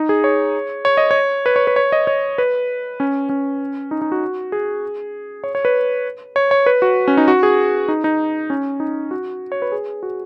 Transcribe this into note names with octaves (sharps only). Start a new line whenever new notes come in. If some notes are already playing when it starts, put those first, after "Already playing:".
Already playing: D#4
G#4
C#5
C#5
D#5
C#5
B4
C#5
B4
C#5
D#5
C#5
B4
C#4
C#4
D#4
D#4
F#4
G#4
C#5
C#5
B4
C#5
C#5
B4
F#4
C#4
D#4
F#4
G#4
D#4
D#4
C#4
D#4
F#4
C#5
B4
G#4
F#4